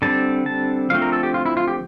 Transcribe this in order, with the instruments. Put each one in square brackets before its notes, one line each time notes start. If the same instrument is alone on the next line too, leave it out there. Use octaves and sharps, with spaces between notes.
[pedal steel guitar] D3 G3 C4 A5
A5
D3 F3 A3 C4 F5
A#4
A4
G4
F4
E4
F4
G4